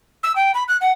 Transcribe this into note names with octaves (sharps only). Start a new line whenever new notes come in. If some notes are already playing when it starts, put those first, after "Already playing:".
E6
G5
B5
F#6
F#5